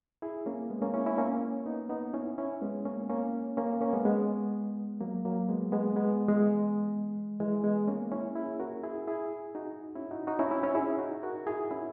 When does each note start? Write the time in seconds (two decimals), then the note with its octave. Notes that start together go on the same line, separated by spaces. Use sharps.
0.22 E4 G#4
0.46 A#3 C#4
0.70 G#3 B3
0.82 A#3 C#4
0.94 C#4 E4
1.06 C#4 E4
1.18 A#3 C#4
1.66 B3 D#4
1.89 B3 D#4
2.13 C#4 E4
2.38 C#4 E4
2.62 G#3 B3
2.85 A#3 C#4
3.10 A#3 C#4
3.57 A#3 C#4
3.81 A#3 C#4
3.93 G#3 B3
4.05 G#3 B3
5.01 F#3 A#3
5.25 F#3 A#3
5.49 G#3 B3
5.72 G#3 B3
5.96 G#3 B3
6.28 E3 G#3
7.40 E3 G#3
7.63 G#3 B3
7.87 A#3 C#4
8.12 C#4 E4
8.36 E4 G#4
8.60 F#4 A#4
8.84 E4 G#4
9.08 E4 G#4
9.55 D#4 F#4
9.96 C#4 E4
10.11 D#4 F#4
10.27 D#4 F#4
10.39 C#4 E4
10.51 C#4 E4
10.63 C#4 E4
10.75 E4 G#4
10.99 D#4 F#4
11.23 F#4 A#4
11.47 E4 G#4
11.71 C#4 E4